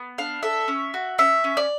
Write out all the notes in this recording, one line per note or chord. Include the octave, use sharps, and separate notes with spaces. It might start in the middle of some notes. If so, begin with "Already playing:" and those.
Already playing: B3
D4 F5
A4 E5
C#4
F#4
C#4 E5
C#4
D5